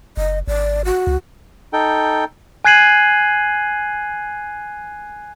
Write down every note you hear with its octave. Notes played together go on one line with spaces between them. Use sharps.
F#1 D#5
G#1 D5
F#4
C#2
D#4 A4 G5
G#5 F#6 G#6 C7 D#7 F#7